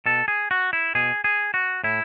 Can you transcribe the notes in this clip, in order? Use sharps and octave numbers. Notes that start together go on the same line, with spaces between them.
B2 A4
G#4
F#4
E4
B2 G#4
G#4
F#4
A2 E4